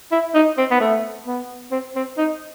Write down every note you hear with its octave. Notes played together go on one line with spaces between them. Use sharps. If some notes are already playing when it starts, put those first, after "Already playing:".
E4
D#4
C4
B3
A3
B3
C4
C4
D#4